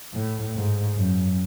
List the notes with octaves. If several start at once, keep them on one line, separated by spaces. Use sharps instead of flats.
A2
G#2
F#2